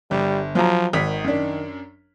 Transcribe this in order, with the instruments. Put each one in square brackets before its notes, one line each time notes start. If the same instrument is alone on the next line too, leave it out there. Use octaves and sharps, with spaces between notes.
[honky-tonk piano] G1 [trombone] G3
[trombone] F3 [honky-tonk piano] F#3 A#5
[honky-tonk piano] G#1 B6 [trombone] D#3
[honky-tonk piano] F#2 D4